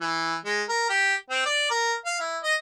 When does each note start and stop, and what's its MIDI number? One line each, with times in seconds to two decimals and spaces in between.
0.01 0.36 52
0.45 0.63 56
0.69 0.89 70
0.90 1.14 67
1.30 1.44 60
1.46 1.69 74
1.71 1.94 70
2.06 2.20 77
2.20 2.38 64
2.44 2.55 75